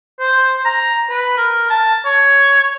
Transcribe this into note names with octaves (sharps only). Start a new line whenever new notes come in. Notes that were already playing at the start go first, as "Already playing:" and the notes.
C5
A#5
B4
A#4
A5
C#5